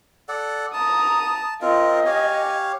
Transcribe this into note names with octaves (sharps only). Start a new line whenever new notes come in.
A4 D5 F#5
A5 A#5 D#6
C4 F4 A#4 D#5
G4 C#5 F5 G#5